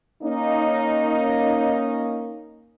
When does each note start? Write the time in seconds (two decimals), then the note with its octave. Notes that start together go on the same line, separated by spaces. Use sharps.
0.23 A#3 C#4 D#4